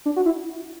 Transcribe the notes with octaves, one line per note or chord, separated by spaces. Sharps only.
D4
F#4
E4